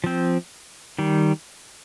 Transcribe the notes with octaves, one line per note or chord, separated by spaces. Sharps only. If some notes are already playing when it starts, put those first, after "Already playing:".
F3 C4
D#3 G3